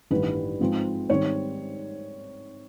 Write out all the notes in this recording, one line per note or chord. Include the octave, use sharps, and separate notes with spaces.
A1 G2 D#3 G3 B4
G#2 F3 G#3 C4
G#2 D#3 G3 C4 C#5